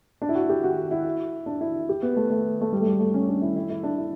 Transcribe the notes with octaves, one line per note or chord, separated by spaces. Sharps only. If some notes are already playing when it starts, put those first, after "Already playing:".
D4
E4
F#4
G4
F#4
E4
D4
E4
G4
B3
A3
A3
A3
G3
A3
G3
A3
C#4
D4
E4
E4
E4
D4
E4